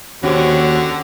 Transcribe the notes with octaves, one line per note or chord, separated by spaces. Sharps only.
D#2 D3 C#4 F#4 G4 C5